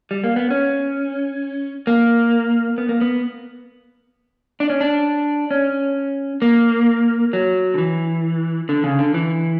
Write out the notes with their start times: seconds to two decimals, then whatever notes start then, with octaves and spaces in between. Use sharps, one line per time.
0.11 G3
0.24 A#3
0.36 B3
0.51 C#4
1.87 A#3
2.78 B3
2.89 A#3
3.01 B3
4.60 D4
4.70 C#4
4.81 D4
5.51 C#4
6.42 A#3
7.33 F#3
7.74 D3
7.78 E3
8.69 D3
8.84 C#3
8.99 D3
9.14 E3